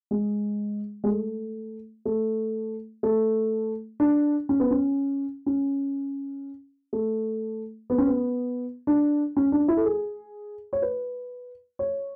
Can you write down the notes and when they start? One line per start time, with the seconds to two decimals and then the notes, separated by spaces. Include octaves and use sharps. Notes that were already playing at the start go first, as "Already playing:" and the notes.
0.11 G#3
1.04 G#3
1.08 A3
2.05 A3
3.03 A3
4.00 D4
4.49 C#4
4.60 B3
4.71 C#4
5.46 C#4
6.93 A3
7.90 B3
7.98 C#4
8.07 B3
8.87 D4
9.37 C#4
9.52 D4
9.68 E4
9.77 A4
9.85 G#4
10.73 C#5
10.82 B4
11.79 C#5